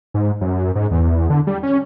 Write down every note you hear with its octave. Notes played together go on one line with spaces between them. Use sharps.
G#2
F#2
G#2
E2
D3
G3
C#4